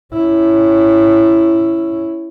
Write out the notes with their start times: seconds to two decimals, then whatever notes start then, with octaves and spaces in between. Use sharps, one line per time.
0.14 C#4 E4